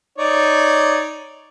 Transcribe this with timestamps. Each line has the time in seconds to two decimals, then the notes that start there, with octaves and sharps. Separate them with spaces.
0.18 D#4 C#5 D5